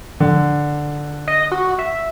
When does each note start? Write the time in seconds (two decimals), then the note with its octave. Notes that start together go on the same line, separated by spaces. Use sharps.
0.20 D3
1.28 D#5
1.52 F#4
1.79 E5